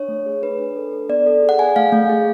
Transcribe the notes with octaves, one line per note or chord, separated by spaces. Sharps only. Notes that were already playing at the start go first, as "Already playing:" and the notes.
Already playing: D4 C#5
A3
G#4
D4 B4
D4
A4
A4
B3 D5
A4
G#4
F#5
G#4 G#5
A3 F5
A3
G#4